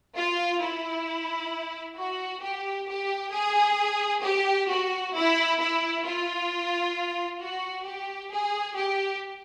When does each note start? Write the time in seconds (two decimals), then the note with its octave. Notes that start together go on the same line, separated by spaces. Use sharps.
0.17 F4
0.62 E4
1.98 F#4
2.43 G4
2.89 G4
3.33 G#4
4.24 G4
4.69 F#4
5.15 E4
5.60 E4
6.06 F4
7.41 F#4
7.86 G4
8.32 G#4
8.77 G4